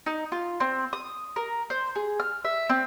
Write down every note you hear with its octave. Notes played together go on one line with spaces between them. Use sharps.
D#4
F4
C4
D#6
A#4
C5
G#4
F6
E5
C4